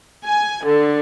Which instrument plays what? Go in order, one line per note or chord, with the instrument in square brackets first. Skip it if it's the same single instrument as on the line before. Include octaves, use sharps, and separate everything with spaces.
[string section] G#5
D3